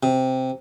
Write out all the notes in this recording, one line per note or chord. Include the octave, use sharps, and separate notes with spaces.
C3